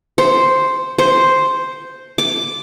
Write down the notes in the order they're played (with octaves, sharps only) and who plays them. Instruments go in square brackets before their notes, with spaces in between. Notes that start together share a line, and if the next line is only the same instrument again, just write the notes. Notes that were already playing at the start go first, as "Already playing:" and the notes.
[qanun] C5
C5
D6